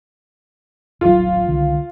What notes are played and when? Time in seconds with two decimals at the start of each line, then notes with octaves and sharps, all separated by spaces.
1.01 D#1 A1 F#3 F4
1.48 C2 D3 D#3